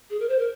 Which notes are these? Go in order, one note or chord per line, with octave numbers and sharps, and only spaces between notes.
G#4
A#4
C5
A#4